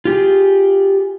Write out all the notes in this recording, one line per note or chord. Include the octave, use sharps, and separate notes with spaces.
F4 G4 G#4